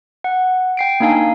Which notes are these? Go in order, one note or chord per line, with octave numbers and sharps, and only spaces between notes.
F#5
G5 C7 D7
A#3 D4 D#4 F5 G#5